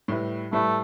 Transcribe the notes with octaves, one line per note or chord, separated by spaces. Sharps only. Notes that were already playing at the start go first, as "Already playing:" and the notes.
A2 G3 E4 B4
A2 G3 A3 E4 B4